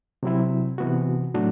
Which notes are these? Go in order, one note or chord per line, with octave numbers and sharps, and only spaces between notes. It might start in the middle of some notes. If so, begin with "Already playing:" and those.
C3 F#3 C4 E4
C3 E3 B3 F#4
A2 F#3 A3 D4 F#4